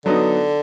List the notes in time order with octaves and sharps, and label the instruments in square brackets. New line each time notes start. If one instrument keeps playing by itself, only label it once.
[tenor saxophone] D3 [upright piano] F#3 B3 D#4